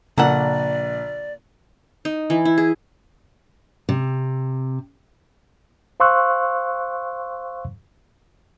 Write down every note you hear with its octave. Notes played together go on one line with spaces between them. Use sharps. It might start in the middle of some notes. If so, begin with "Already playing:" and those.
A#1 C#3 A#3 A4 D5 F#5
D#4
E3
E4
G#4
C3
C5 F5 C6 C#6 E6 F#6